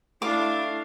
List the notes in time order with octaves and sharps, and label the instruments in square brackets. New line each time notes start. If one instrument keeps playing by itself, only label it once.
[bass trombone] A3 [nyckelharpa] D4 F5 [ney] E4 [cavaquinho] D6